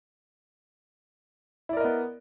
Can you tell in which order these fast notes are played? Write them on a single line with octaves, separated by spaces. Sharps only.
E4 D5 A#4 D#5 B3